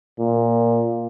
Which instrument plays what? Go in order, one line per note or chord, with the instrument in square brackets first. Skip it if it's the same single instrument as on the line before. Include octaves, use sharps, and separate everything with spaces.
[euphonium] A#2